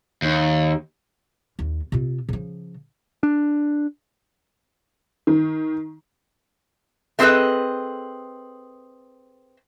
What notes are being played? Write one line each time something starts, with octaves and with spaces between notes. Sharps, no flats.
D#2
D#2
C3 F4
C#3 F3
D4
D#3
A3 C4 G#4 A4 B4 D#5